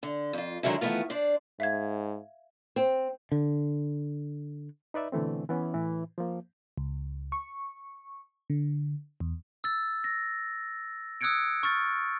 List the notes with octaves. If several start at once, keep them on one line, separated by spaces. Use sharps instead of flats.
D3
F2 F4
D3 D#3 F#3 G#3 E4
D#3 E3 A3 B3 F4
D4 C5 D5
G#2 E5 F5 G#6
C4
D3
D#4 B4 D5 E5
B2 D3 E3 A3 C4
E3 B3 C#4
A2 E3
F3 A#3
C#2
C#6
D3
E2
E6 A6
A#6
D#6 E6 F#6 G#6 C#7 D7
C#6 F6 A6